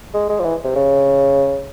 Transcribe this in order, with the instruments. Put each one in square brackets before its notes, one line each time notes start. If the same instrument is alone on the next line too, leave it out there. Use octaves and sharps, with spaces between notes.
[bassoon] G#3
G#3
F3
E3
C3
C#3